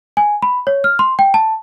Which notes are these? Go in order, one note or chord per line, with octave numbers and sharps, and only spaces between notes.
G#5
B5
C#5
F6
C6
G5
A5